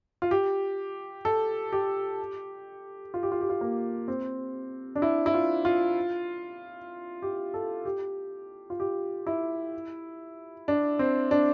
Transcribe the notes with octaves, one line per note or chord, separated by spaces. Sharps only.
F4
G4
A4
G4
F4
G4
F4
G4
F4
A#3
C4
D4
E4
E4
F4
F4
G4
A4
G4
F4
G4
E4
D4
C4
D4